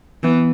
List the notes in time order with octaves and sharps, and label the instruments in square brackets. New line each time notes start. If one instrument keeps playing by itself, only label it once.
[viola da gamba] E3 [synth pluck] B3